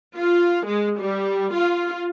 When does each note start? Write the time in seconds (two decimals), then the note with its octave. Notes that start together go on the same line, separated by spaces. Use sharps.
0.16 F4
0.66 G#3
0.98 G3
1.54 F4